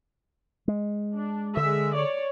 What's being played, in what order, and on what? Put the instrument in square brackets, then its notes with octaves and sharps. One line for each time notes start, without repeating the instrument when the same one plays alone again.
[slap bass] G#3
[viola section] D4
[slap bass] D3 [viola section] G#3 E5
[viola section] C#5 D5